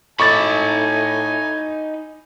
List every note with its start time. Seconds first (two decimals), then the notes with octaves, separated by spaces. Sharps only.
0.20 A2 D#4 G#5 B5 C#6 D6 A6